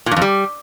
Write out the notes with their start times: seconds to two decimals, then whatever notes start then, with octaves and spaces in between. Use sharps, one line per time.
0.06 A#2
0.11 G2
0.16 F2
0.22 G3